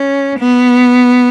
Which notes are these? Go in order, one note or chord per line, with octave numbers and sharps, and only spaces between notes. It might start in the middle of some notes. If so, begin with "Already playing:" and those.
Already playing: C#4
B3